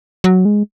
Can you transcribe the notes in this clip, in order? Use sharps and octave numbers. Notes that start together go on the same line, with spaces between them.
F#3
G#3